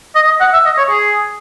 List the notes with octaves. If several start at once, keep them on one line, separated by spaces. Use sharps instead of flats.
D#5
D#5
F#5
E5
D#5
C#5
G#4